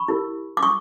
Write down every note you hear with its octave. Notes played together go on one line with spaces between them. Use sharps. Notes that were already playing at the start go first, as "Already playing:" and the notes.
Already playing: B5 C#6
E4 G4 A#4
D6
C#6 D#6